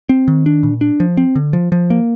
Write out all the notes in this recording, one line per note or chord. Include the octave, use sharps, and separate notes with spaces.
C4
D#3
D4
A#2
D4
F3
C4
D3
F3
F3
A#3